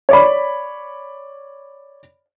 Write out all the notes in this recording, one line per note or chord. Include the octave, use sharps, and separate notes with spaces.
C#5 D5 B5